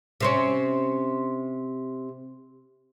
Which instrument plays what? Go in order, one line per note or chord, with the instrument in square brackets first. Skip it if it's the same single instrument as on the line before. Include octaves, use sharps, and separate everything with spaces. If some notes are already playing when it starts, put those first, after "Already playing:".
[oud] C3 C4 C#4